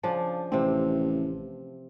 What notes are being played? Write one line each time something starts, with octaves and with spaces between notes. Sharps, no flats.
C#3 F3 D4
A1 C3 C4